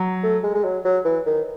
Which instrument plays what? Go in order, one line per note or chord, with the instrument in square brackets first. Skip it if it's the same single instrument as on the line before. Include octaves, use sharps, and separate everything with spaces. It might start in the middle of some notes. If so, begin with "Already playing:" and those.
Already playing: [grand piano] F#3
[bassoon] A3
G#3
G#3
F#3
F#3
E3
D#3